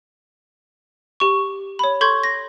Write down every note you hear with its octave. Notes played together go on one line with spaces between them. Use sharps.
G4 C#6
C#5 B5
A4 C6 C#6 G6 G#6
A#6